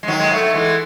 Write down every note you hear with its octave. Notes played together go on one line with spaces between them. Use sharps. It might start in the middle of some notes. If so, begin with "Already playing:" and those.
G#3
D#3 F#3
G#3
F#3 A3
F#3
E3 G#3